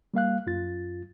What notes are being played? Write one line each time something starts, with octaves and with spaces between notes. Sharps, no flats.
G3 A#3 F5 F#6
F#2 F4 A6